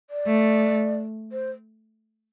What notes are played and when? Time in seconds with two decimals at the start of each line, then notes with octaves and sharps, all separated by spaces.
0.10 D5
0.27 A3
1.32 C5